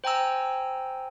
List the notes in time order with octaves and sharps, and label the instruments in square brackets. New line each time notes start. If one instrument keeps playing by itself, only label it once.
[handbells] C5 G5 G#5 A#5 E6